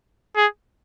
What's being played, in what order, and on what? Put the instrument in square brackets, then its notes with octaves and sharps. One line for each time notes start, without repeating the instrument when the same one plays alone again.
[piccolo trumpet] G#4